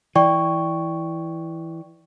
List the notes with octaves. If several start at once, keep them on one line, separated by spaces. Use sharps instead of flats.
E3 D5 G5 C#6